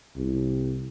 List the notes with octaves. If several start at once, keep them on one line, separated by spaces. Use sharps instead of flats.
C2